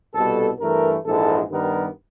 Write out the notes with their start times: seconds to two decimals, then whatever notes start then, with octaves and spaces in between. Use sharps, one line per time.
0.14 C2 B2 G3 A4
0.59 G2 E3 A3 A#4
1.04 A#1 G#2 E3 G#3 A4
1.50 G2 D#3 G3 B3 A#4